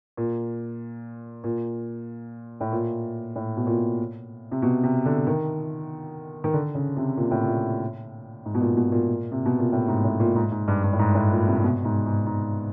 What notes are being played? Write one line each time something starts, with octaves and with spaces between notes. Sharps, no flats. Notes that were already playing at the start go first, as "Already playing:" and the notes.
A#2
A#2
A2
A#2
A2
B2
A#2
C3
B2
C3
D3
D#3
D#3
D3
C#3
C3
A#2
A2
A#2
G#2
B2
A#2
B2
A#2
C3
B2
A#2
A2
G#2
A2
A#2
G#2
G#2
G2
G2
A2
G#2
A2
A#2
C3
C3
B2
G#2
G#2
G#2